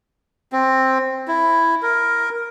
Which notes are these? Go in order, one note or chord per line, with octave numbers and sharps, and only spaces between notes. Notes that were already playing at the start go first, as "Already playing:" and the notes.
C4
E4
A#4